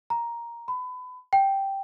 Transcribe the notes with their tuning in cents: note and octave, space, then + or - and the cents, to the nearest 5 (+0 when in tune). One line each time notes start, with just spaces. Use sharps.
A#5 +10
B5 +30
G5 -5